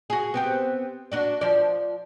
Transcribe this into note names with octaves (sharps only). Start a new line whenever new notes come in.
F#4 G#4
B3 C4 G4
D4 F#4 D5
F3 D5